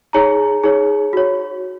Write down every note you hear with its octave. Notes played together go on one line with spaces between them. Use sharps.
D#4 G#4 C#5 A#5
D#4 G#4 C#5
F#4 C#5